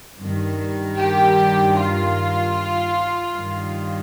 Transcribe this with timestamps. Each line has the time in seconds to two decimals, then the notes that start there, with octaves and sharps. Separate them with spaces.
0.17 G2 D#3
0.96 G4
1.75 F4
3.33 G2 D#3